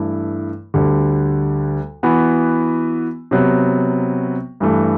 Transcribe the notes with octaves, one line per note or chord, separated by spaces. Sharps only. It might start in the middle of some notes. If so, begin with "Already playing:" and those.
Already playing: G2 E3 A3 E4 A4
D2 D3 G3
E3 B3 F#4
C3 F#3 B3
G2 E3 A3